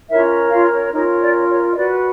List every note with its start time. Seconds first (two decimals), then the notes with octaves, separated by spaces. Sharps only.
0.09 C#4 E4 F4 A#4 C#5 E5
0.51 F4 F5
0.92 C#4 D#4 F4 A#4 C#5 D#5
1.21 D5
1.48 C#5
1.70 D#5
1.75 F#4 B4 D5